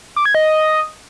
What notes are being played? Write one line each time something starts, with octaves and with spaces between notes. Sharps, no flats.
D6
G#6
D#5